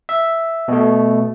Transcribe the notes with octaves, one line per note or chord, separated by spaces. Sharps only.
E5
B2 A3